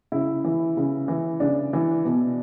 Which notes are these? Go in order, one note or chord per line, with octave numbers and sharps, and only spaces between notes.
C#3 E4
E3
C#3
E3
C#3 D4
E3
B2